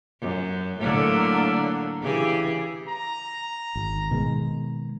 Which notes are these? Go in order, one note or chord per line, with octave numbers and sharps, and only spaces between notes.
F#2
A2 D3 F#3 A#3 D4
C#3 E3 G4 G#4
A#5
G#1
B2 D#3 G#3